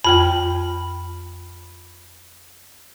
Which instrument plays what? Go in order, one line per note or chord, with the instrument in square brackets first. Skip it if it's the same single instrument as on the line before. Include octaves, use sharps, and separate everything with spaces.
[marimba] F2 F4 G5 [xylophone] B5